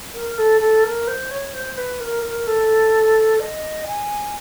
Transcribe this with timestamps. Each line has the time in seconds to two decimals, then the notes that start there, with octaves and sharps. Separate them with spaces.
0.14 A#4
0.38 A4
0.60 A4
0.83 A#4
1.07 C5
1.31 C#5
1.54 C5
1.77 B4
2.00 A#4
2.23 A#4
2.46 A4
3.39 D#5
3.86 G#5